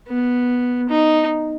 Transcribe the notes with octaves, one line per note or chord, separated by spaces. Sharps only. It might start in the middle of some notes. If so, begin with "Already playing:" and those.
B3
D#4